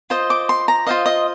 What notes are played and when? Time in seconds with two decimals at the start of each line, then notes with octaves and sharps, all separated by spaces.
0.10 F4 C5 D#5
0.30 D6
0.49 C6
0.68 A#5
0.87 F4 C5 D#5 F5
1.06 D#5